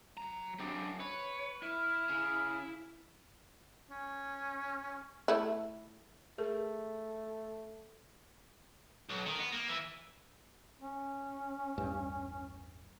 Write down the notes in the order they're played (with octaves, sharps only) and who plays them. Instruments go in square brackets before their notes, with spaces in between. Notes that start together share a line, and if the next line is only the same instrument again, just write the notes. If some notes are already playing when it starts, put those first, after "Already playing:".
[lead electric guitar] F#3 A#5
[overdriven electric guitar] F#2 C4 [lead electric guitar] D4 G4
[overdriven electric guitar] B4 [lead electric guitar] C#5
[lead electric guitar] E4 [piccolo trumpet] F6
[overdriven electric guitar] C#3
[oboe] C#4
[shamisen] A3 E4
[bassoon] A3 [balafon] G#4 A#4
[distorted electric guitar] B1
D#3
B3
A#3
E3
[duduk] C#4
[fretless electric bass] A1 E2 G2